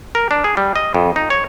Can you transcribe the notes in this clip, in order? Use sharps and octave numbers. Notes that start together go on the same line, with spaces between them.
A#4
D4
G#4
G3
D#5
F2
D#4
C#5